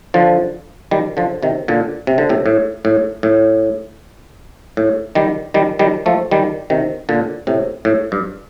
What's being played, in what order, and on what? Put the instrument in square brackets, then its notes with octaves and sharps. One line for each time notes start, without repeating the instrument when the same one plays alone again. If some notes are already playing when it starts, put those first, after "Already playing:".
[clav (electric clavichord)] D3 F3
D#3 G3
D3 F3
C3 D#3
A#2 D3
C3
D3
A2 C3
A2
A2
A2
A2
D#3 G3
D#3 G3
D#3 G3
F3 A3
D#3 G3
C3 D#3
A#2 D3
A2 C3
A2
G2